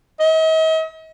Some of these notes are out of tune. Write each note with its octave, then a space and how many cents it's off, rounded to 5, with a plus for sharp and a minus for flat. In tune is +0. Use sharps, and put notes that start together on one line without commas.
D#5 +45